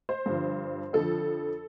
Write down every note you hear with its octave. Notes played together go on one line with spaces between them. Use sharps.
C5
G2 D3 F3
F2 D3 F3 A4